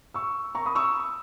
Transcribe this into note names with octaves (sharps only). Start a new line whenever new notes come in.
C#6 E6
A#5 C#6
B5 D#6
C#6 E6